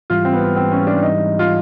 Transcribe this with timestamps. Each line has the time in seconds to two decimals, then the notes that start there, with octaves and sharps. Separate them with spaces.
0.10 G#2 E3 G3 F4
0.25 C4
0.33 B3
0.56 C4
0.72 C#4
0.87 D4
1.03 D#4
1.39 F4